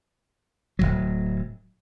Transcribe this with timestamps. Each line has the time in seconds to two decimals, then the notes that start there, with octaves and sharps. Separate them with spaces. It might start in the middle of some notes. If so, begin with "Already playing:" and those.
0.79 D1 G1 F#3